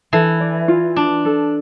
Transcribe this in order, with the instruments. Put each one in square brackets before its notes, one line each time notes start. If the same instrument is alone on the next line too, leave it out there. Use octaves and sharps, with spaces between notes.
[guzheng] E3 [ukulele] A4
[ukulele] D5
F4
[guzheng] D4 [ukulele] A5
[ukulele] A4